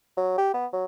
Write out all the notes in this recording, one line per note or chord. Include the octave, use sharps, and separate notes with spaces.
F#3
G4
B3
F#3